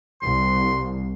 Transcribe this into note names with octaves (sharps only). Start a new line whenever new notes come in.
C2 C6